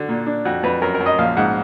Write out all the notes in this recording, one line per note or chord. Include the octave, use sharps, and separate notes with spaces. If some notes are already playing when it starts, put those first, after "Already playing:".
Already playing: D3 F#4
A#2
D4
F2 F#4
F2 B4
F#2 A#4
A#4
F#2
D#5
A#1 F5
G#2 F#5